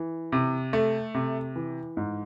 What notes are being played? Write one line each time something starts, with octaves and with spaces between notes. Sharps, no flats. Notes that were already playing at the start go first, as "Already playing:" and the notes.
Already playing: E3
C3
A3
C3
E3
G#2